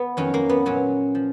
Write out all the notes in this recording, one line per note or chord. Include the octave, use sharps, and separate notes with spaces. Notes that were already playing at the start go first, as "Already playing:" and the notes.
Already playing: B3
F2 D#3 F#3 C#4
A#3
B3
A#2 F#3 C#4
F3